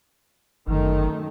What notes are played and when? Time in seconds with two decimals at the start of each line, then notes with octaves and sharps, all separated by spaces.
0.67 G1 F#2 D#3 A3